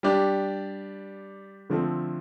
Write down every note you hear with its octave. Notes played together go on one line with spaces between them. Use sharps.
G3 D4 G4 D5
D3 F3 A3 C4